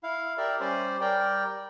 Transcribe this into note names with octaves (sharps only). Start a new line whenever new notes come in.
E4 F5
G4 A#4 D5 E5
G3 C#4 C5 D5
G3 A#4 D5 G5